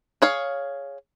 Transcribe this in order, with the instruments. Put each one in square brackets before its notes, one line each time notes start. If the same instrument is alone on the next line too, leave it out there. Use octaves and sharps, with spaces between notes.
[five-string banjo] G#4 C#5 F5